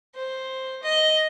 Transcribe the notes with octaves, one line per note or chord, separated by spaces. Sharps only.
C5
D#5